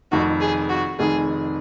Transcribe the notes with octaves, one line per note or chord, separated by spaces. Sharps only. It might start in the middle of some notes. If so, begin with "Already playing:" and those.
F1 F2 D#3 F#4
G#4
F#4
F1 F2 D#3 G#4